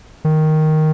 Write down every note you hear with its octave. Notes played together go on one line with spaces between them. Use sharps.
D#3